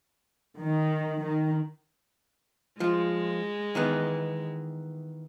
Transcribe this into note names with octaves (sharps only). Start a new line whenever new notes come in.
D#3
D#3
F3 G#3 F4
D#3 E3 B3